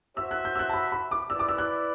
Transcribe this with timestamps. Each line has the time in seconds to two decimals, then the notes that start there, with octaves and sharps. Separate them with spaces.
0.16 F#4 C5 E5 E6
0.31 F#6
0.45 G6
0.55 E6
0.59 F#6
0.69 A5
0.74 B5
0.92 B5
1.11 D6
1.30 E4 B4 D5 E6
1.39 D6
1.49 E6
1.58 F#6